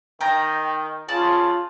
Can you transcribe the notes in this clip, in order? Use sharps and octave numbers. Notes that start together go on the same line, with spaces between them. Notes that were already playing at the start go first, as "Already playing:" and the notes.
D#3 G5 A#5
C#3 F4 D5 A5